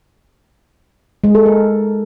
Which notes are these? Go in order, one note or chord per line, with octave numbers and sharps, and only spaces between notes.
G#3
A4
A#4